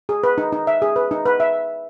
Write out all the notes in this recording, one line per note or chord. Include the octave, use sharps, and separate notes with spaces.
G#4
B4
D#4
D#4
E5
G#4
B4
D#4
B4
E5